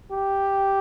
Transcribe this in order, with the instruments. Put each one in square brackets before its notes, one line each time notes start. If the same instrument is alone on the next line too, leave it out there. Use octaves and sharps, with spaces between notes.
[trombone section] G4